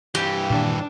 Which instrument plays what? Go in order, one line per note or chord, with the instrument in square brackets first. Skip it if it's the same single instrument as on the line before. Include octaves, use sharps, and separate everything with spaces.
[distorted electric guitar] G2 E3 [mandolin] G4
[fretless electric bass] A#2 D#3 A#3 [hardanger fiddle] D4